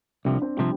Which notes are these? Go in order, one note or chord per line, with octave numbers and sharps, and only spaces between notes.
C2 C3 F3 D4
C4
C3 F3 G3